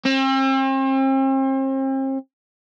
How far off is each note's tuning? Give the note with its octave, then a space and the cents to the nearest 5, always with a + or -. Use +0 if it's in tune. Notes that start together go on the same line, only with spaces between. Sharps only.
C4 +40